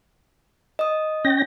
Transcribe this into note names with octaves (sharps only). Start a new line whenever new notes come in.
D#5 D#6
C#4 G5 A#6